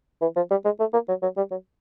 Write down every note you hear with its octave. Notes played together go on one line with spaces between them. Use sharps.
E3
F3
G3
G#3
A3
A#3
F#3
F#3
G3
F#3